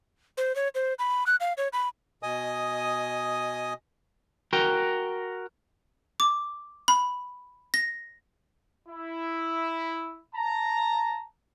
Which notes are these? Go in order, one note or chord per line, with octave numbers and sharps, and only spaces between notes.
C5
C#5
C5
B5
F#6
F5
C#5
B5
B2 D#5 G#5 D#6
F#4 A#4 G5
D6
B5
A#6
E4
A5 A#5